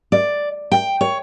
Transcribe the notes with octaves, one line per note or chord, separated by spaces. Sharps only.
D5
G5
C#5